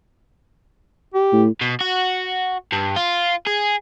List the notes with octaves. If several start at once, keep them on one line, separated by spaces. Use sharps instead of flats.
G4
A2
B2
F#4
G2
F4
G#4